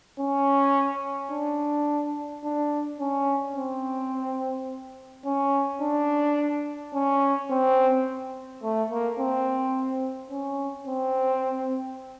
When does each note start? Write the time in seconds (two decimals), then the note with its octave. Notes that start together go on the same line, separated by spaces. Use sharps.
0.19 C#4
1.31 D4
2.44 D4
3.00 C#4
3.56 C4
5.25 C#4
5.82 D4
6.95 C#4
7.51 C4
8.63 A3
8.91 A#3
9.20 C4
10.31 C#4
10.87 C4